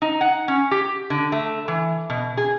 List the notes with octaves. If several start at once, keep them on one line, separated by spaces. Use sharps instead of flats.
D#4
F#5
C#4
G4
D3
A3
E3
B2
G#4